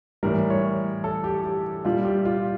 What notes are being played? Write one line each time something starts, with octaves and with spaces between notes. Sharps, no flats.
A2 E3 G3 A#4
C#5
A4
G4
G4
A#2 G3 F4
G4
F4